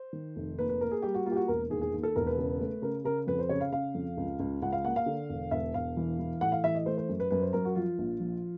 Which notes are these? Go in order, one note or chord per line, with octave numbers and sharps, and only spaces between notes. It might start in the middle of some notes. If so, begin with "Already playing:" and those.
Already playing: C5
D#3
F1
A#3 B4
B4
A#3 A#4
G#4
G3 G4
F#4
A#3 F4
G4
F#4
E1 A#4
D#2 G#4
G#4
D#2
A4
E1 A#4
B4
C#3
A3
C#3 A#4
C#3 A#4
F2 B4
C5
C#3 C#5
F5
C#3 F5
F2
C#2
C#2
C#2 F#5
F5
A#3 F#5
F5
D3
E1
E1 E5
E1 F5
E3
E3
A2 F#5
F5
E3 E5
D#5
A3 C5
C5
F#2
B4
F#2 B4
C5
F#2 A#4
F#4
F3 F4
A#1
F3